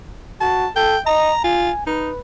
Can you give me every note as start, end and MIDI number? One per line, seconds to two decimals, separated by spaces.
0.41 0.66 66
0.41 0.68 81
0.76 0.96 69
0.76 1.00 79
1.06 1.32 75
1.06 1.43 82
1.44 1.71 65
1.44 1.82 80
1.87 2.10 63
1.87 2.20 71